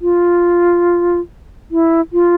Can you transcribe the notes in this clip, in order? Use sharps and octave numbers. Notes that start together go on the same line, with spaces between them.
F4
E4
F4